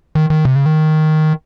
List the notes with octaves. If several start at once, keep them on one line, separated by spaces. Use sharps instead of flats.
D#3
D#3
C3
C#3
D#3